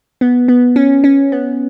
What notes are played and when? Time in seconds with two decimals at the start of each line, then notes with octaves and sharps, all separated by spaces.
0.21 B3
0.48 B3
0.76 C#4
1.04 C#4
1.32 B3